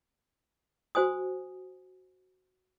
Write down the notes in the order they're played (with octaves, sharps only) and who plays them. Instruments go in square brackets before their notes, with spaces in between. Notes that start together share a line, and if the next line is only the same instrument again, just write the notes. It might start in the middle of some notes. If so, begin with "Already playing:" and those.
[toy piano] F#4 C5 G#5 D#6